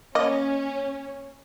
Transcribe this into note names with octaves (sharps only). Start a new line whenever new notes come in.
A#3 C#4 D#5